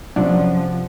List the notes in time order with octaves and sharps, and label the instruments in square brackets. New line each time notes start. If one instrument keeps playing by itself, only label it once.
[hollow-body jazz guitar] F#2 [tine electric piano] C3 F4 F#5 [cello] F3 [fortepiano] D4